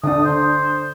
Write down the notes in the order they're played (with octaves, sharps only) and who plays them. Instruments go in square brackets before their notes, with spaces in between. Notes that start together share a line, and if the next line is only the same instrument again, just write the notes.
[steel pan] D3 D4 [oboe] D#6
[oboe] C5